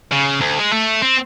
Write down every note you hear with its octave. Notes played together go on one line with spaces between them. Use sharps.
C#3
D2
G#3
A3
C4